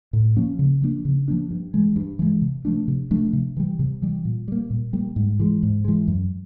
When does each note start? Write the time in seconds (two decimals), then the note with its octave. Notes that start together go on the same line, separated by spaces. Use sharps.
0.13 A2
0.37 F3 A#3 C#4
0.59 C#3
0.81 F3 A#3 D4
1.05 C#3
1.28 F3 A#3 D4
1.51 G2
1.74 E3 G#3
1.96 G2
2.19 E3 G#3
2.42 C3
2.65 F3 A3 D4
2.88 C3
3.11 F3 A3 D4
3.33 C3
3.57 E3 G3
3.79 C3
4.02 E3 G3
4.25 A#2
4.48 G3 A#3
4.70 A#2
4.93 G3 A#3
5.16 G#2
5.40 E3 G#3
5.63 G#2
5.85 E3 G#3
6.08 F#2